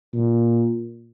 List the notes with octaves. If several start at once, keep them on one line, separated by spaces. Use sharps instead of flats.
A#2